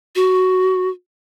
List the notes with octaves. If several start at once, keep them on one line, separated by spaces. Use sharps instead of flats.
F#4